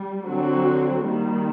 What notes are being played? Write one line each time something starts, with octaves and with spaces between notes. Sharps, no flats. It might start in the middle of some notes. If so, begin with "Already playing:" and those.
Already playing: G3
D3 F#3 C4 F#4
D#3 G3 A#3